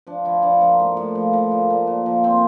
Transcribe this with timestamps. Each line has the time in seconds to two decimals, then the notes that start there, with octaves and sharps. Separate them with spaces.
0.07 F3 D4
0.25 F3 E4
0.43 F3 D4
0.61 F3 A#3
0.80 A2
0.97 A2
1.15 F3
1.33 F3
1.52 A#2
1.70 A#2
1.87 A#2
2.06 F3
2.24 A#2 C4